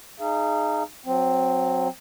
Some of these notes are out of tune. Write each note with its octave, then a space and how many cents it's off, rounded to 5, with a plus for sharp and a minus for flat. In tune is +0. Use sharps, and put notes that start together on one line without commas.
D#4 -20 G#4 +10 F5 -35
F#3 -20 C4 +0